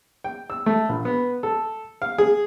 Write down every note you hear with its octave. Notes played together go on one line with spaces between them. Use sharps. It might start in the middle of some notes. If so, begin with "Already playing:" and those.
G5
E6
A3
A#1
B3
A4
F5
G#4